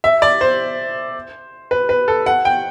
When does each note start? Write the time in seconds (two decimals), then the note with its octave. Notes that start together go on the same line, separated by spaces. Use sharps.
0.04 E5
0.22 D5
0.41 C5
1.71 B4
1.89 B4
2.08 A4
2.26 F#5
2.45 G5